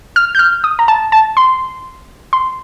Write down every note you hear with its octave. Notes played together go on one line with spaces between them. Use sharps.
F6
G6
F6
D#6
A#5
A5
A5
C6
C6